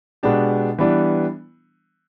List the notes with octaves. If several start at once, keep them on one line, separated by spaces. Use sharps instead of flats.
B2 G#3 B3 D4 G4
E3 G3 B3 D4